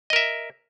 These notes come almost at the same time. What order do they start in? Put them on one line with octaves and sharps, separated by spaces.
D#5 A#4 E5